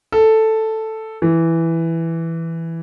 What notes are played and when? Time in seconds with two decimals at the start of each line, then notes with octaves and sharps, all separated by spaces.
0.12 A4
1.22 E3